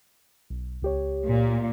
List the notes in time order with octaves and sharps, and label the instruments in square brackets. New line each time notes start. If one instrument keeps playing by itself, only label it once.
[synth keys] B1
C#2 G4 C#5
[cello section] A#2